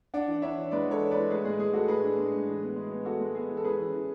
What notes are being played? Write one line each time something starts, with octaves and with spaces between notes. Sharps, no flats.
D4 D5 F#5
E3
D4 C#5 E5
E3
G#3 B4 D5
E3
A4 C#5
E3
G#3 B4 D5
A2 G#4 B4
G#3 G#4
G#3 G#4
A2 F#4 A4
A2 G#4 B4
D4
G#3
A2
E3
B3
G#3
B3
B3 F#4 A4
G#3
B3 G#4
E3
A4
C#4 G#4 B4
E3
E3